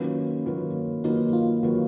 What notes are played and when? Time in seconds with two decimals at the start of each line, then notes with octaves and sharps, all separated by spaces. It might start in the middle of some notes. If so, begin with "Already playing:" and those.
Already playing: D#3 F#3 A#3 C#4 F4 B4
0.46 D#3 F#3 A#3 F4 B4
1.04 D#3 F#3 A#3 D#4 F4 B4
1.33 F4
1.63 D#3 F#3 A#3 F4 B4